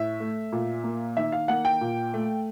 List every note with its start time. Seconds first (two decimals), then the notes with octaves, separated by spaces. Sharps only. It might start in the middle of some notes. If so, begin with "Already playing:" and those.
Already playing: A2 E5
0.20 A3
0.52 A#2
0.84 A#3
1.17 D#3 E5
1.32 F5
1.48 A#3 F#5
1.65 G5
1.81 A#2
2.14 A3